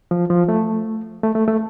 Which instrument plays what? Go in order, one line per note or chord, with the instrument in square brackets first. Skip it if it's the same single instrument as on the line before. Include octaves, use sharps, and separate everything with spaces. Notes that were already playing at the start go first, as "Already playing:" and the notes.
[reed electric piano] F3
F3
A3
A3
A3
A3